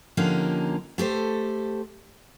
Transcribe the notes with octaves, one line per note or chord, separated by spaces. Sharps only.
D3 F3 A#3 C#4 D#4 G4
A3 G4 A4 C5